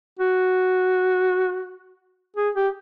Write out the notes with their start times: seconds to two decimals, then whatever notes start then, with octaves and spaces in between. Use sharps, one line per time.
0.19 F#4
2.36 G#4
2.55 G4